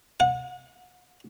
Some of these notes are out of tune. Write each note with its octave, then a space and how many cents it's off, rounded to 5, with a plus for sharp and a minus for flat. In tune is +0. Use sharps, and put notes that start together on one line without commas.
F#5 -35